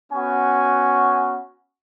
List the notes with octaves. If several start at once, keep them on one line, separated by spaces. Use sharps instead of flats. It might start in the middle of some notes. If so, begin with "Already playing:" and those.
B3 C#4 F#4 G#5